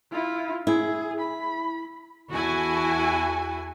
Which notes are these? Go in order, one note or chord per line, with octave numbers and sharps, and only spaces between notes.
E4 F4
E4 G#4
B5
E2 E4 F#4 A4 G#5